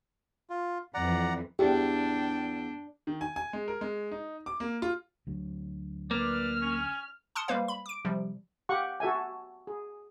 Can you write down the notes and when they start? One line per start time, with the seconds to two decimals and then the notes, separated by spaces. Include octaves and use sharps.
0.50 F4
0.94 F2 E3 D5 F#5 A#5
1.59 E2 D4 G4 G5
3.07 D#3
3.21 G#5
3.36 G#5
3.53 G#3
3.68 A#4
3.81 G#3
4.11 D#4
4.46 D6
4.60 A#3
4.82 F4
5.27 D2 F#3
6.11 A#3 B4 D5 F6
6.62 C#4
7.35 A5 C6 D#6 F6 C#7
7.48 G3 G#3 A#3 B4 C5 F5
7.68 B5
7.86 D6 D7
8.05 C3 F3 G3
8.69 G4 F5 F#5 C#6
9.00 F#4 A4 E5 G#5
9.67 G#4